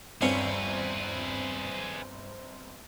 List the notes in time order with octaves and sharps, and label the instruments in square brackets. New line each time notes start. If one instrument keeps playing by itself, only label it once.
[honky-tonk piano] G1 C4 C#7 [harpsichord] G2 C#4 C#5 [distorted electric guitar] G#4 B4